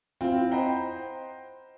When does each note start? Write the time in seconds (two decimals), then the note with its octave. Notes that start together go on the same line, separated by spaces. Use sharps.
0.21 C4 E4 F4 G5
0.51 C5 D#5 F#5 G5 A#5 B5